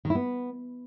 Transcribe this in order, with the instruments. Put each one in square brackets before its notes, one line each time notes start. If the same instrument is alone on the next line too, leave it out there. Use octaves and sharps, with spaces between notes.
[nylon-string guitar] D#3
E4
B3